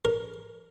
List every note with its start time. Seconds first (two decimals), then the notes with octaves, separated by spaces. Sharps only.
0.05 A#4